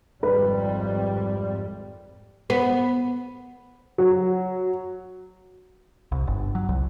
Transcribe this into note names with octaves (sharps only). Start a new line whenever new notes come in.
G#1 F2 G3 B4
B3
F#3
C2
G1
F#3
C2